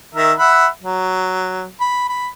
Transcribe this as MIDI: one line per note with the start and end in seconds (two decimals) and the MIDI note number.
0.15 0.33 51
0.15 0.33 70
0.15 0.33 76
0.38 0.67 76
0.38 0.67 78
0.38 0.67 83
0.83 1.66 54
1.80 2.06 83
2.09 2.28 83